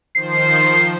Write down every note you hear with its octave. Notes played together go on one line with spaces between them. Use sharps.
D#3 F3 C5 C7